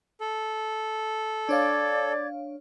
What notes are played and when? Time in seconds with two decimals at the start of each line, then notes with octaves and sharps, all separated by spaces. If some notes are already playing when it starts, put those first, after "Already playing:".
0.21 A4
1.49 D4 C#5 D5 F5 D6 G#6